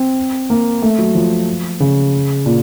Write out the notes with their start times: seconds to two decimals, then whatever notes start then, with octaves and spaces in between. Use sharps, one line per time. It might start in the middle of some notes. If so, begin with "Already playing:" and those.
Already playing: C4
0.50 A#3
0.82 A3
0.99 F#3
1.15 F3
1.80 C#3
2.46 A#2